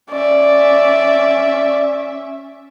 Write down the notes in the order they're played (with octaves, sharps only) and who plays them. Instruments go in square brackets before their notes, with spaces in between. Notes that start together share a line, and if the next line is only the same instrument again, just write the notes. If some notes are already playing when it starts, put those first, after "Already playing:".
[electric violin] C#4 E5 [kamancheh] D5